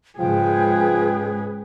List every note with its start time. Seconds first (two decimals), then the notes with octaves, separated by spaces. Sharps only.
0.19 G#2 C#3 F3 G#3 G#4 B4 G5